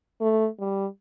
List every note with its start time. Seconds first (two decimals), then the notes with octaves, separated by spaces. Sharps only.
0.21 A3
0.60 G3